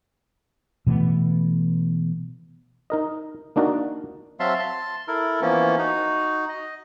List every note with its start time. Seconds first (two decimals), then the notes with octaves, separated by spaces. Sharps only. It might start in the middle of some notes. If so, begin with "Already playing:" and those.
0.87 B2 E3 A3 B3
2.90 D#4 A#4 D#5
3.56 A#3 D4 D#4 F#4 A#4 D5
4.40 F#3 C4 E5 F5 A5 C6
4.59 A5 C6
5.08 E4 A4 A#4
5.42 E3 F3 A#3 B3 C#4
5.78 D#4 F#4
6.49 D#5